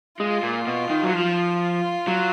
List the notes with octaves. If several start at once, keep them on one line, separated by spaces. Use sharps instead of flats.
G#3 F4
A#2
B2
D#3
F#3
F3
F#3